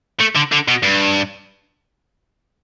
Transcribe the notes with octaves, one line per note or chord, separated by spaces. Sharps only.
A3
D3
D3
B2
G2